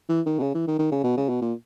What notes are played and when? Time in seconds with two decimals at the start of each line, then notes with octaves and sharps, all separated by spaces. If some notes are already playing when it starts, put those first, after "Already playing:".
0.09 E3
0.26 D#3
0.39 B2
0.42 C#3
0.55 E3
0.68 D#3
0.79 D#3
0.92 C#3
1.04 B2
1.17 C#3
1.29 B2
1.42 A#2